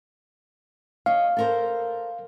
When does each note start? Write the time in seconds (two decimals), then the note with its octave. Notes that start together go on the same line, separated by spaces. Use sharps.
1.06 C#5 D#5 F5
1.37 A4 A#4 C5